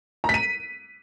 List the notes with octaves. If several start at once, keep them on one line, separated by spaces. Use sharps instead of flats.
A#5
B6
D#7